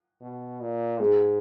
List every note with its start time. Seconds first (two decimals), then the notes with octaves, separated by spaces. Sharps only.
0.21 B2
0.60 A#2
1.00 G#2 G#3